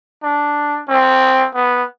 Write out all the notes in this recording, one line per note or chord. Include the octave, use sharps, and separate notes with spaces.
D4
C4
B3